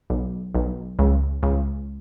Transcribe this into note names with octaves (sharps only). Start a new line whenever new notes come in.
B1
B1
C#2
C#2